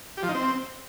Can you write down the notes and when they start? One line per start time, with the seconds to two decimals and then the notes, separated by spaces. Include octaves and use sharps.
0.17 G4
0.23 F3
0.29 D#4
0.34 C4